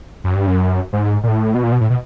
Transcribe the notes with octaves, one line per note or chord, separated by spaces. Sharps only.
F#2
G2
F#2
G#2
A#2
A2
B2
A#2
B2
A2
B2